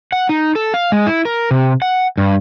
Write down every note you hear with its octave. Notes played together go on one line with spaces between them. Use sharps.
F#5
D#4
A4
F5
G#3
E4
A#4
C3
F#5
G2